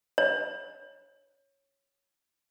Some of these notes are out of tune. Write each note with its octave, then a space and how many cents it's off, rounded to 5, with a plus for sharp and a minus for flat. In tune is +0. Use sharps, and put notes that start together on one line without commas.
C#5 -5